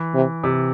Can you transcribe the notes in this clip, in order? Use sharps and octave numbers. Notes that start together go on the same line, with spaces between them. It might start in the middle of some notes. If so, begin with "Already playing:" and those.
Already playing: E3
C3
C3